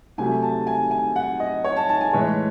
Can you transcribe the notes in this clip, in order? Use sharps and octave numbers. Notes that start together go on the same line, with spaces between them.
C3 F#3 A3 G#5
A5
G#5
G#5
F#5
D#5
C#5
A5
A5
G#5
A2 E3 G#3 C#5